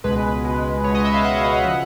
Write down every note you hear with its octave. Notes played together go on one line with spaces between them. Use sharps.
C#2 B2 G#3 B4
C#2 B2 G#3
C#2 B2 G#3 C#5
D#5
E5
F5
C#2 B2 G#3 F#5
C#3 F3